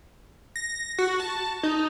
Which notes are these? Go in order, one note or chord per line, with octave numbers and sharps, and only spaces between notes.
A#6
F#4
A5
D#4